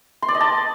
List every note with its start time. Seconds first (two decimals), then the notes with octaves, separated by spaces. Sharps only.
0.22 C6
0.28 D5
0.34 D#5
0.40 A5